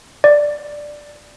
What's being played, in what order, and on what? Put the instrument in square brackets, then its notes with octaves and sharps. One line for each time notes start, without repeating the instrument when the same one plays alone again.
[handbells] D5